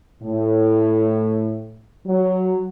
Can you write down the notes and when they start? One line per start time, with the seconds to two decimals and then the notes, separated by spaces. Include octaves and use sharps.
0.23 A2
2.06 F#3